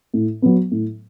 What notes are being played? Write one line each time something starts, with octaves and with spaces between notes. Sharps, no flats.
A2
F#3 B3
A2